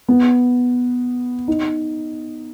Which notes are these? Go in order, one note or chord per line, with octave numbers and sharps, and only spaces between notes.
B3
D#4